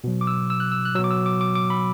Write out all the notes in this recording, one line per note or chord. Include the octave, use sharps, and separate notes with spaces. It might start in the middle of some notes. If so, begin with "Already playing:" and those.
B2 F#3
D6
E6
E6
F#6
E6
F#6
B2 F#3 E6
D6
E6
D6
D6
D6
B5